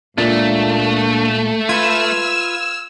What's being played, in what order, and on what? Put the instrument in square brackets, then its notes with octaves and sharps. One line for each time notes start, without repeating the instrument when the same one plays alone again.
[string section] C#2 [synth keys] A#2 [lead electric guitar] A3 [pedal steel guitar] A#3 D4
[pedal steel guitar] F4 B4 [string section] E6 F6 [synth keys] G#6